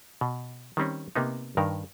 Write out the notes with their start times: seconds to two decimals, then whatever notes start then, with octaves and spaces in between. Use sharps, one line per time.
0.21 B2
0.77 D#3 G3 C4 C#4
1.16 C3 A#3 B3 D#4
1.57 G2 D#3 A#4